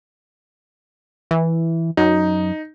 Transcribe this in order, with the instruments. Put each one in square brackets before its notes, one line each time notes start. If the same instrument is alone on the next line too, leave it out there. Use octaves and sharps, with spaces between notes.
[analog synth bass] E3
[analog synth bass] F#2 [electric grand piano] D#4